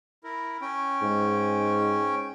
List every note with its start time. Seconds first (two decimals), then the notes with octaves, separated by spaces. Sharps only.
0.24 E4 A#4
0.61 C#4 G5
1.02 G#2